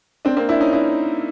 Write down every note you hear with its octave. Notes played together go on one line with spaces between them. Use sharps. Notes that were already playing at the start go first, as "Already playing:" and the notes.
C4 D4
A#3 C4
D4 E4
C#4 D#4
D4 E4